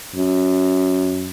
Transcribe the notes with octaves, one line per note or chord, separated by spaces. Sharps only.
F#2